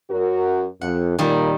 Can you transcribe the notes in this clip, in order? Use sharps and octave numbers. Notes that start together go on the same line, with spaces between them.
F#2 F#4 A#4
F2 F#5
A#2 D#3 G3 A#3